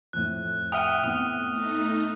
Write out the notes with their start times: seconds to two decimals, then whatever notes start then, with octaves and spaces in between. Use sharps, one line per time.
0.13 F2 A2 F#6
0.72 E5 F#5 G5 D#6 F6 D#7
1.04 A2 B3 C4 D#6
1.52 A3 D#4